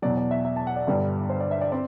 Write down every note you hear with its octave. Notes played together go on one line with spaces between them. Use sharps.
E2 B2 F#3 D5
D5
E5
E5
A5
F#5
D5
G1 G2 D3 G3
C5
D5
E5
D5
C4 D5